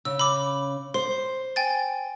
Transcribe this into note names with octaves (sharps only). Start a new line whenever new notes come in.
C#3 E6
B5 D6
C5 C6
G5 G#5 A6